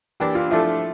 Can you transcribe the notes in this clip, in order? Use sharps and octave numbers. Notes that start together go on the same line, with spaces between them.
E3 A#3 D4 G4
F4
F3 A3 D4 E4 A4